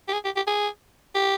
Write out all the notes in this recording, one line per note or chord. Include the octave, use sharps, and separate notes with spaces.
G4
G#4
G4
G4
G#4
G4